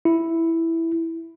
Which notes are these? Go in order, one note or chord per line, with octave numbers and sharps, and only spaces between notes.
E4